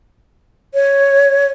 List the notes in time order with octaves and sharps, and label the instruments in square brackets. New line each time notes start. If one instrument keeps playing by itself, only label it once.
[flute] C#5